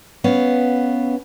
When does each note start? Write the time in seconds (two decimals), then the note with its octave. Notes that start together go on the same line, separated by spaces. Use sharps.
0.24 B3 C#4 F5